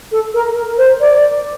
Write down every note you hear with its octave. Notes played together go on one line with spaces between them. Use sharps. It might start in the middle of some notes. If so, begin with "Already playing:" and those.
A4
A#4
A#4
C5
D5